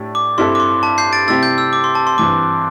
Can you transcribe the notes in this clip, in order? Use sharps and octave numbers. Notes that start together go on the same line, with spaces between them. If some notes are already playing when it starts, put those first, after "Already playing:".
Already playing: A2 A3 D4 G4
D6
G2 G3 C4 E4 A4 C6
D6
C6
A5
G6 C7
A6 D7
C3 G3 C4 E4 G4 E6 A6
G6
E6
D6
C6
A5
C6
G2 E3 C4 D6